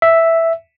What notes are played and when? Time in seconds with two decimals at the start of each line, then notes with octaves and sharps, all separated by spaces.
0.02 E5